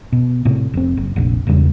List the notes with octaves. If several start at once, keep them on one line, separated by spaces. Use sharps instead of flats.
B2
A2 C3
F1 C4
F#1
F1 A#1
E1 E2 C#3 G3